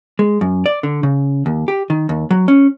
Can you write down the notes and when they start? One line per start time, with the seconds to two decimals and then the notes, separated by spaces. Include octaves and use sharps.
0.19 G#3
0.41 F#2
0.66 D5
0.83 D3
1.03 C#3
1.46 D#2
1.68 G4
1.90 D#3
2.09 D#2
2.31 F#3
2.48 C#4